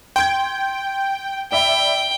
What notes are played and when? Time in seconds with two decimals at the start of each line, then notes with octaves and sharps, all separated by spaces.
0.16 G5 C6 G#6
1.52 D5 E5 G5 B5